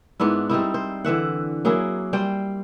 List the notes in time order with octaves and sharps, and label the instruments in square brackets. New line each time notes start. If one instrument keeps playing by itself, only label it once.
[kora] G#2 B3 D4 E4
G3 C4 D#4 E4
C5
D3 E3 E5 F#5
F#3 A#3 E4 G#4
G3 C5 G5